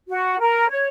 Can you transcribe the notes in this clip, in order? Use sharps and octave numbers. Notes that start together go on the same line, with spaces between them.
F#4
A#4
C#5